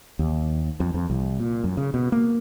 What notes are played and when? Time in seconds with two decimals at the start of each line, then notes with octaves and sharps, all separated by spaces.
0.19 D#2
0.80 F2
0.94 F2
1.10 C2
1.40 A#2
1.64 F#2
1.77 C#3
1.94 B2
2.12 A#3